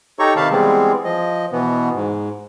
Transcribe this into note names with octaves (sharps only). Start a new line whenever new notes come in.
D#4 G4 A4 C#5 A#5 C#6
C3 D#3 F5 A5 B5
E3 G3 G#3 B3 C4 G#4
F3 D#5
B2 E3 B3
G#2